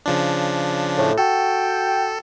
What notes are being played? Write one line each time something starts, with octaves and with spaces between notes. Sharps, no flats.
C#3 F3 D4
A2
F#4 A4 G5